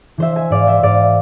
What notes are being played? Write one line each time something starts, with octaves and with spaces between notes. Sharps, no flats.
E3 C5 E5
E5 G#5
G#2 D5 F5
C5 E5
G#2 D5 F5